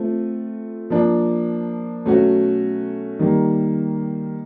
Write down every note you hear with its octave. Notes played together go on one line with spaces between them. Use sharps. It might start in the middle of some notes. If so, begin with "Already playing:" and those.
Already playing: A3 C4 F4
F3 A#3 D4
B2 F#3 A3 C#4 F#4
D#3 G3 A#3